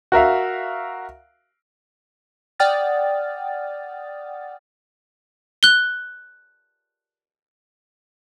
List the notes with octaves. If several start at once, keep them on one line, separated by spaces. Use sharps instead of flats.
F#4 A#4 E5 F5
D5 F#5 G5 D#6 F6 A6
F#6 G7